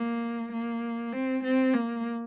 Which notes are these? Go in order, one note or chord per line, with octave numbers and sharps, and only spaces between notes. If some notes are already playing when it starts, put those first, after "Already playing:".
Already playing: A#3
A#3
C4
C4
A#3